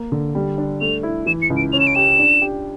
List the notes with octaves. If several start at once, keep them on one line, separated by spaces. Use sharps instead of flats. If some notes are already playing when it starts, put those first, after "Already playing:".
Already playing: A#3
D3
G3
D4
A3 F7
E4
E3 E7
C#7
C#2
D7
C#4 F7
E7
D7
G4 E7
D4
G4